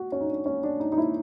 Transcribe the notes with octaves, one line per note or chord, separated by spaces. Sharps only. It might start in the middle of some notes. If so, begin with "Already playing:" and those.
Already playing: F#4
C#4
D#4
D4
C#4
D4
D#4
D#4
E4